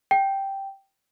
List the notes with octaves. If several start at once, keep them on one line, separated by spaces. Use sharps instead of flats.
G5